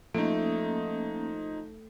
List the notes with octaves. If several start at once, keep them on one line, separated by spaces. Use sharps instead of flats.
F3 A3 A#3 C#4 D#4